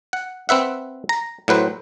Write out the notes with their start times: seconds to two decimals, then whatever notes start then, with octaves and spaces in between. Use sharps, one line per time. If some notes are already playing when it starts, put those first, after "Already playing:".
0.13 F#5
0.49 C4 B4 E5 F#5
1.09 A#5
1.48 A2 F#3 B4 C5